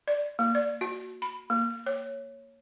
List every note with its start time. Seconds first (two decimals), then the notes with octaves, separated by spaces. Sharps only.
0.07 D5
0.39 A#3
0.55 D5
0.81 F#4
1.22 B5
1.50 A#3
1.86 C#5